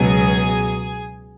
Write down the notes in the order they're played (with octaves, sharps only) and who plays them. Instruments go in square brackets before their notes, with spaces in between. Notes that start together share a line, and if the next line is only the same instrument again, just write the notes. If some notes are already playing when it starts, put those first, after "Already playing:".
Already playing: [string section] C#2 B2 F#3 G#4